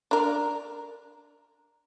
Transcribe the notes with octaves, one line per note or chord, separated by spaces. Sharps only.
D4 A#4